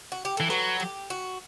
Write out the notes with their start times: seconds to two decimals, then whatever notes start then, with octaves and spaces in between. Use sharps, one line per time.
0.12 F#4
0.25 G4
0.37 E3 A4
0.50 F#3 B4
0.80 G4
1.10 F#4